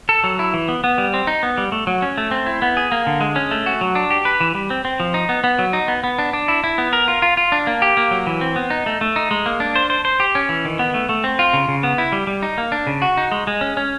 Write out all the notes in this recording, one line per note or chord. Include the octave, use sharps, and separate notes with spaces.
A4
F#3
E4
E3
B3
B3
G3
C4
D#4
B3
G3
A3
F#3
C#4
A3
C4
E4
B3
G#4
A#3
D3
G#3
C#4
A3
F#4
F#3
D4
G4
B4
E3
G3
C4
C4
F3
D#4
B3
B3
F#3
D#4
B3
B3
D4
D4
E4
E4
B3
A#4
F4
F4
F4
D4
A#3
G4
A#3
F#3
E3
C4
B3
D#4
A3
A3
D#4
G#3
A#3
D4
C5
C5
C5
G4
C#4
E3
D#3
B3
A3
A3
C4
F4
C#3
C#3
B3
E4
G3
G3
D#4
A#3
D4
C#3
F#4
D#4
G#3
G#3
C#4
C#4